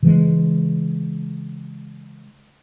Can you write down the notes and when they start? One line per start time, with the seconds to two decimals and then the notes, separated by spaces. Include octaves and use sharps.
0.03 C#3 E3 G#3